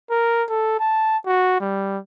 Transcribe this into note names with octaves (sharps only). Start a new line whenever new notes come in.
A#4
A4
A5
F#4
G3